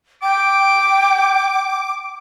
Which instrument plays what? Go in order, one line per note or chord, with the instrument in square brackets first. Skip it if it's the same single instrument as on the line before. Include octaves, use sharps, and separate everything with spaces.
[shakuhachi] G5 [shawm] D6